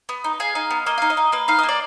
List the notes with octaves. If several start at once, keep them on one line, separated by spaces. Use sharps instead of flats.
B3
D#4
G#4 F5
D#4
B3
A#3 D#5
D#4 F5
D#5
D#4
A#3 B4
D#4 F5
D#5
A#3
D5